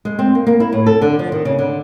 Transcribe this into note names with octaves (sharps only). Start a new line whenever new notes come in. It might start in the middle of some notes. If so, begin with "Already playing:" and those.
G#3
C4
A#3
A#3
E4
A2
A4
D3
F3
D#3
C#3
D3